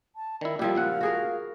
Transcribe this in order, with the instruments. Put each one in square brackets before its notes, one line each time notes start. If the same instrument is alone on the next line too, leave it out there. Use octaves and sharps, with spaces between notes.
[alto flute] A5
[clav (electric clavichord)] D#3 E4 [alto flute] D5
[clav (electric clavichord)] A#2 G3 [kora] F3 E4 G4 [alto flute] G5
[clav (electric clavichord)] C#2 A#2 F#5 [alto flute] F5
[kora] F#4 G#4 A#4